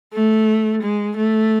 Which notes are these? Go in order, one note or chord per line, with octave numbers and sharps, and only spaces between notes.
A3
G#3
A3